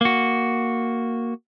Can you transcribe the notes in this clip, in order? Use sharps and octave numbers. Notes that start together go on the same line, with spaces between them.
A#3 F#4